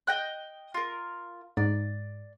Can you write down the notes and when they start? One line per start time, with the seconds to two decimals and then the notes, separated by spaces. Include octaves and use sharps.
0.07 D#5 G5 F#6
0.74 F4 A#4
1.57 G#2 D5